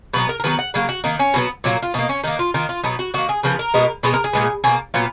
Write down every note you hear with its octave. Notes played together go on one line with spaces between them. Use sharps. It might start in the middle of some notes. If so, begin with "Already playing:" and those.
B2 F#3 B3 B4
A#4
A#4
D#3 F#3 B3 B4
F#5
C#3 F#3 A#3
F#4
D#3 A#3 D#4
C#4
B2 F#3 B3
A#2 F#3 A#3
F4
B2 A#3 D#4
C#4
D#3 A#3 D#4
F4
D#3 A#3 F4
F4
B2 F#3 B3 D#4
F#4
D#3 A#3 F#4
G#4
C#3 F3 B3 A#4
A#4
B2 G#3 B3
B2 G#3 B3 B4
A#4
G#4
A#2 G#3 B3
B2 A#3 G#4
A#2 F#3 B3 F4